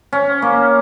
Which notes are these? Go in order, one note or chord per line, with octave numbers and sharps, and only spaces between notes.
C#4
A#3